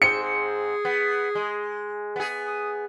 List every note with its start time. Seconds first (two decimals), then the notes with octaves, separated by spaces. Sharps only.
0.02 G#2 C4 G#4 C#7
0.23 G#4
0.85 B3
1.35 G#3
2.16 B3 G#4
2.48 D#6